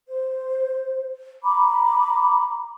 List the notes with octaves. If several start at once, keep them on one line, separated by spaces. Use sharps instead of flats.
C5
A#5 B5 D6